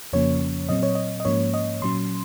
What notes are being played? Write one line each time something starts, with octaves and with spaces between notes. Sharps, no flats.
F2 C#3 F3 A#3 C#4 C#5
A#2 F#3 C4 D#5
C#5
D#5
D#5
G#2 F3 A#3 C#4 C#5
D#5
A#2 F#3 C#4 C6